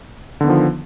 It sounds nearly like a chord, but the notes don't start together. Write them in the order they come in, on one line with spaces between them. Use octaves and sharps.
D3 B3 D#3 F3